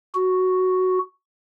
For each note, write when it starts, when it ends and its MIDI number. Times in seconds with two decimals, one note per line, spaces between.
0.15 0.98 66